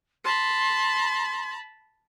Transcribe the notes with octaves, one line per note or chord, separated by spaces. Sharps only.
A5 B5 C6